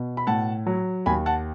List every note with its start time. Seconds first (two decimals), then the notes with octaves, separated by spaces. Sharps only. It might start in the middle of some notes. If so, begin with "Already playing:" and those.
Already playing: B2
0.17 B5
0.27 A2 F#5 A5
0.67 F#3
1.06 D#2 G#5 B5
1.26 F#5 A5